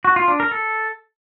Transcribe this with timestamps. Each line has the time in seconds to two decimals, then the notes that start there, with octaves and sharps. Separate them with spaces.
0.05 F#4
0.16 F4
0.28 D4
0.40 A#4
0.51 A4